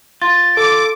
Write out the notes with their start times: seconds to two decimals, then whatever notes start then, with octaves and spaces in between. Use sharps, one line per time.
0.22 F4 A6
0.57 A4 D6